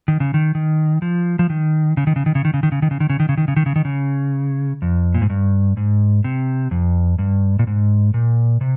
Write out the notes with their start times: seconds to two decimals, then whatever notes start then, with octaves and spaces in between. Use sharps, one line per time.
0.08 D#3
0.20 C#3
0.34 D#3
0.55 D#3
1.02 F3
1.39 F3
1.50 D#3
1.97 C#3
2.07 D#3
2.16 C#3
2.26 D#3
2.35 C#3
2.45 D#3
2.54 C#3
2.63 D#3
2.72 C#3
2.82 D#3
2.91 C#3
3.00 D#3
3.10 C#3
3.20 D#3
3.29 C#3
3.38 D#3
3.48 C#3
3.56 D#3
3.66 C#3
3.76 D#3
3.85 C#3
4.82 F2
5.14 A#2
5.22 G#2
5.30 G2
5.77 G#2
6.24 C3
6.71 F2
7.19 G2
7.59 A#2
7.67 G#2
8.14 A#2
8.61 C3